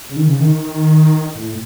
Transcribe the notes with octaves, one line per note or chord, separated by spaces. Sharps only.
C#3
D#3
C#3
D#3
A2